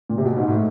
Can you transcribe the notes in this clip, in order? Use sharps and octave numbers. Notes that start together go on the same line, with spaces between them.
A#2
C3
B2
G#2
A2